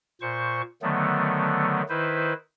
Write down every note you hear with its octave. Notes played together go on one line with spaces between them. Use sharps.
A#2 C5 C#6
D3 D#3 F#3 A3 B3
D#3 E4 B4 C5